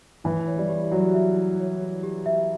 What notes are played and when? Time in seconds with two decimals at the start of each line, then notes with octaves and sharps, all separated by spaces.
0.24 E3 E4
0.47 C#5
0.58 G3
0.69 G4
0.91 F#3 G4
1.14 E5
1.37 E4
1.59 C#5
1.82 G4
2.03 G4
2.26 E5